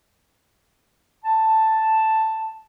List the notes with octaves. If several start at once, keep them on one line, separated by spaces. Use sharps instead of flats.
A5